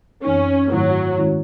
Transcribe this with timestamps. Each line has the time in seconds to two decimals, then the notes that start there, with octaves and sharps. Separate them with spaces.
0.24 F#2 E3 C4 C#4 D#4
0.70 G#2 D#3 F#3 A3 C4 E4
1.18 D#3 G#3 C#4 E4